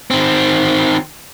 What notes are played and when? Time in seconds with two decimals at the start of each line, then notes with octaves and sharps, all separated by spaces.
0.11 D#3 C4